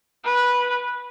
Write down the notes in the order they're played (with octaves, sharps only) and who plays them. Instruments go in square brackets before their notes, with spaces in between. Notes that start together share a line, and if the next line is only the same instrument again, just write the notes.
[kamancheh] B4